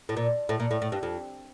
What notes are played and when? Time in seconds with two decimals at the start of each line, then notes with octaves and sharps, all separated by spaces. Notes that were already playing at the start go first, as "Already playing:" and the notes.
0.09 A2
0.17 A#2
0.49 A2
0.60 A#2
0.71 A2
0.82 A2
0.92 G2
1.03 F2